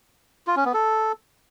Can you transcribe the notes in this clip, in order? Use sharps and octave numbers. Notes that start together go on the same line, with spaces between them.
F4
C#4
B3
A4